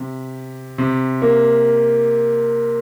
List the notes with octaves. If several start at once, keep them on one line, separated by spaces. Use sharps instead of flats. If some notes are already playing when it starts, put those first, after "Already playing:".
Already playing: C3
C3
A#3